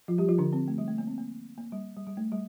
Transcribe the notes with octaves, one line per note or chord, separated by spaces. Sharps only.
F3 F4
G3 G4
F3 F4
D3 D4
C4
A3
G3
A3
A#3
C4
A#3
A#3
G3
G3
G3
A3
G3